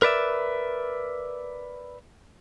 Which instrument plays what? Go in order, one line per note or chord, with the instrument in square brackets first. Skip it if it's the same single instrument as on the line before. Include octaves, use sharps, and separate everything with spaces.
[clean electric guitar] A#4 B4 D5 E5